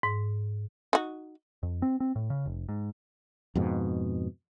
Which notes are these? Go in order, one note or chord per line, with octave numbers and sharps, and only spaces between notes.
G#2
D#4 F#4
F2
C4
C4
A2
C#3
F1
G#2
F2 G#2 B2